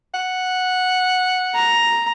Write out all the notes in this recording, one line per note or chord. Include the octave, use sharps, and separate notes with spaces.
F#5
A#5